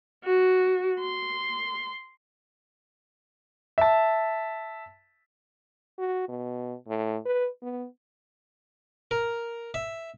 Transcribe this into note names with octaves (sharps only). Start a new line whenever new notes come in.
F#4
C6
E5 A5
F#4
B2
A2
B4
B3
A#4
E5